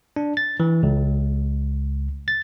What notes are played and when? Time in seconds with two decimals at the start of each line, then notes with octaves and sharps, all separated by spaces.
0.16 D4
0.37 A6
0.60 E3
0.83 C#2
2.28 A6